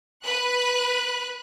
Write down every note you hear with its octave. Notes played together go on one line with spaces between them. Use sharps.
B4 F#6